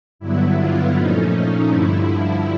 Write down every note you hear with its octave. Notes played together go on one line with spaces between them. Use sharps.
G2 D3 F#3 B3 E4
F4
A#2 F3 A3 C#4 D#4
G2 D3 F3 E4